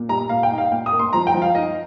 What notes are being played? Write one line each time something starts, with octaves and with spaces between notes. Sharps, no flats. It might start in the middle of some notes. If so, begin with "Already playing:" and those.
Already playing: A#2
G3 A#5
A#2 F5
G5
D#4
F5
A#2 G5
D#6
A#3
C6
F3 A#5
G5
F3
F5
D#4 D#5